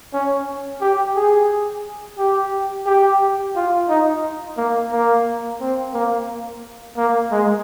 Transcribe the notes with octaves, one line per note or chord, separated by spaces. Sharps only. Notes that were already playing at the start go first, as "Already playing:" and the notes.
C#4
G4
G#4
G4
G4
F4
D#4
A#3
A#3
C4
A#3
A#3
G#3